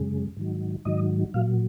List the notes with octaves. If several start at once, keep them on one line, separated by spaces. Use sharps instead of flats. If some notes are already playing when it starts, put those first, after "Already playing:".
Already playing: F#2 C#3 G#3
G#2 D#3 F#3
G#2 D#3 F#3 D#5
A#2 F#3 F5